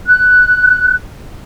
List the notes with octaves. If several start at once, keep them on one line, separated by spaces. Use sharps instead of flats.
F#6